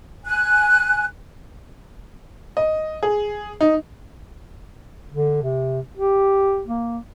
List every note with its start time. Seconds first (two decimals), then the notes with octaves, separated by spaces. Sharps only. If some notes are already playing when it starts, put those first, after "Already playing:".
0.24 G#5 F#6
2.57 D#5
3.03 G#4
3.61 D#4
5.12 D3
5.42 C3
5.97 G4
6.67 A#3